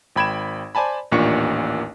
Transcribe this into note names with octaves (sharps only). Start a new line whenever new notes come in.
G#1 G5 B5 G#6 D7 E7
C5 D5 G#5 A5 B5
A1 D#2 A#2 D4 C#6 C#7